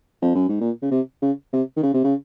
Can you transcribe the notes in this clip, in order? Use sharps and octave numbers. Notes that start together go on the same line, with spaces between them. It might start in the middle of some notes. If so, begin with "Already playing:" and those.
F2
F#2
G#2
A#2
C#3
C3
C#3
C3
D#3
C#3
C3
C#3